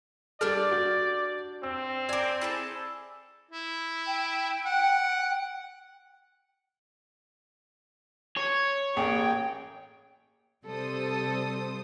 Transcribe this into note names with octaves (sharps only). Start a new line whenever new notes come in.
G3 D4 G4 A4 D5 F6
F#4 G6
C4 E6
A#4 D5 G#5 D6
E4 G#4 A4
E4
G5
F#5
C#5
A1 A#3 G#4 G5
C3 G3 A4 C5 D#6